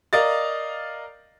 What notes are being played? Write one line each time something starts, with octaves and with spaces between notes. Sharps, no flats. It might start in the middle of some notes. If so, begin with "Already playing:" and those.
A#4 D5 D#5 F5 A6